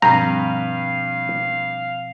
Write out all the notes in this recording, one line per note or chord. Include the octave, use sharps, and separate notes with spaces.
G2 B2 F3 C4 F5 A#5